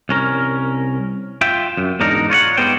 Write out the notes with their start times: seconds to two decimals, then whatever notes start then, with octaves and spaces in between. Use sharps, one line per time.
0.09 C2 C#4 A#4
1.41 F4 E5 G5
1.77 F#2
2.00 E2 G#2 D4 D#4 A#4
2.30 F4 C#5 D#5 F#5
2.57 G#2 G3 B3 C5 G5